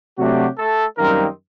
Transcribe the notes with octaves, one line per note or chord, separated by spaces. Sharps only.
C3 F#3 A3 D4 F#4 G4
A3 A4
F#2 D#3 G3 A#3 C4 D#4 A#4